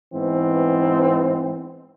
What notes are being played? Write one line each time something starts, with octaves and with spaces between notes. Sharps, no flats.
G#2 E3 B3 C4